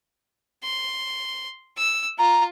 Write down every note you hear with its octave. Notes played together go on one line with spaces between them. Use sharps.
C6
E6
F4 A#5